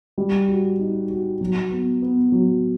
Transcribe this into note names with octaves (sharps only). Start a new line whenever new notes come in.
G3
F#4
D#4
F#4
F#3
B3
B3
F#3